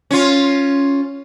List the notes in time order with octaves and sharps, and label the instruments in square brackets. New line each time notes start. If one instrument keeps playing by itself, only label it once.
[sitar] C#4 F4